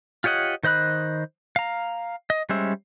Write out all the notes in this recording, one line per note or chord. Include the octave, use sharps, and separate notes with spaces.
F4 G4 C#5 D#5 F#5
D#3 C5 D#5 B5 F#6
F5 A#5
D#5
G3 G#3 C#4 C5 E5